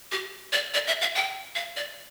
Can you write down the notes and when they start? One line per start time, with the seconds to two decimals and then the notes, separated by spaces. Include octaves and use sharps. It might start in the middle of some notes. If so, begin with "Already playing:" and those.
0.12 G4
0.52 D5
0.74 D5
0.87 E5
1.02 F5
1.15 G5
1.55 F5
1.76 D5